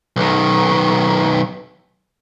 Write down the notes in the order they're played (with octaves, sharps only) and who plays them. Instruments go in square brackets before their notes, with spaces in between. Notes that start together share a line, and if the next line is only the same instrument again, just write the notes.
[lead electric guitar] B1 D#3